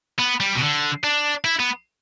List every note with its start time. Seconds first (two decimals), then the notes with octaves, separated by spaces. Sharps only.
0.19 B3
0.40 G3
0.55 B2
0.61 D3
1.04 D4
1.45 E4
1.59 B3